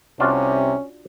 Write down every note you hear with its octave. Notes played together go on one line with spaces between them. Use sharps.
C2 C3 C#4 D4 F4 F#4